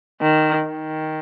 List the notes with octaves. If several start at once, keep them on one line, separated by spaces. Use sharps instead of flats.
D#3
D#3